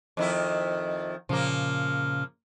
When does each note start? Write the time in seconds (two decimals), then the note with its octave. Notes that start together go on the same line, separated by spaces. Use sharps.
0.17 F2 D#3 E4
1.29 A#2 C#3 F3 A#3